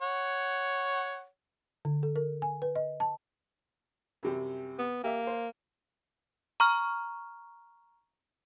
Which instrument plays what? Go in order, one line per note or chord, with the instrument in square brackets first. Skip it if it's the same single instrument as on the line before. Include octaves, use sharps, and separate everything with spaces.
[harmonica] C#5 F#5
[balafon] D3
A4
A#4
G#5
B4
D#5
A5
[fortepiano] F#2 C3 G3
[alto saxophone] B3
[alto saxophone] A#3 [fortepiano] G4 E5
[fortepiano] C5
[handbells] A#5 C#6 F6